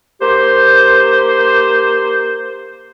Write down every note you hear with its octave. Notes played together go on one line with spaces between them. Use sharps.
A#3 G4 C5